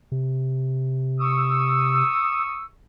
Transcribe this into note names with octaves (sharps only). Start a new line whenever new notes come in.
C3
C#6 D#6 E6